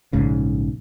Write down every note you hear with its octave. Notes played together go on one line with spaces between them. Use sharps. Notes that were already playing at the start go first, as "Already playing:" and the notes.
A#1 G#2 C#3